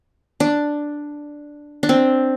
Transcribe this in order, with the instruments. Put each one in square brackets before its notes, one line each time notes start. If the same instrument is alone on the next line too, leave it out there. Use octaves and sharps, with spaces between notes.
[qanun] D4
D4
C4